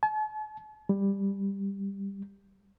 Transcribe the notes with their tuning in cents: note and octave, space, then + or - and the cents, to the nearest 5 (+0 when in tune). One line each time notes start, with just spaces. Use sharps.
A5 -45
G3 +10